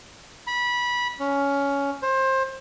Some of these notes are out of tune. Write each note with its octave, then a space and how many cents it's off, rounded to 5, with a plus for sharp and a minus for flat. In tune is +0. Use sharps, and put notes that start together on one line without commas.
B5 -20
C#4 +15
C5 +25